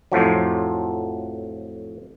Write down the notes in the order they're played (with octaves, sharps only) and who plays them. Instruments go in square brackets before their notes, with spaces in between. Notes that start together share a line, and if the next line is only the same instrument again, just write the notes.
[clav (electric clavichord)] F2 A2 F3 F#3